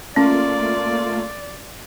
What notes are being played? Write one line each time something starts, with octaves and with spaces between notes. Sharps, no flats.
A3 A#3 C#4 F4 D5